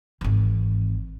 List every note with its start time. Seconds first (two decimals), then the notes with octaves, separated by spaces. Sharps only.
0.21 G#1 E3